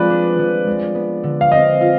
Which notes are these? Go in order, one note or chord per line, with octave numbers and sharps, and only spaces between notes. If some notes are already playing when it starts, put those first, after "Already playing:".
Already playing: F3 G#3 C4 B4 D5
D4
F3
G#3
B3
D3
F5
C4 D#5
F4